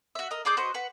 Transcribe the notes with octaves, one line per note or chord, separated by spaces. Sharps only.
F#4 E5
A#4 D#5
D4 G#4 D6 G6
F#4 B4 C5 D#5
B4 F#5